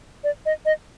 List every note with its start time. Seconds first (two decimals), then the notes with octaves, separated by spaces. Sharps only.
0.24 D5
0.46 D#5
0.65 D#5